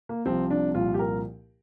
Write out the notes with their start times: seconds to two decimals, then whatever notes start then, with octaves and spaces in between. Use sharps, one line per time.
0.09 A#3
0.25 C2 C3 F3 C4
0.50 D4
0.74 C2 A#2 F3 F4
0.94 G4
0.99 A#4